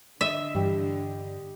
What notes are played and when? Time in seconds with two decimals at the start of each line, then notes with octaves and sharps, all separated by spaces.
0.21 D3 D#5 E5
0.55 G2 E3 G3 G4